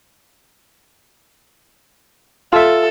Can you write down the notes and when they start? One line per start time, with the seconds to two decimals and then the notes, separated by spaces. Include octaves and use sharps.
2.53 F4 A4 E5